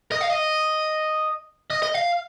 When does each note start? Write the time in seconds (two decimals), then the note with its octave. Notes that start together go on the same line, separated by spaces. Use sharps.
0.12 D#5
0.21 F5
0.30 D#5
1.70 D#5
1.83 D#5
1.94 F5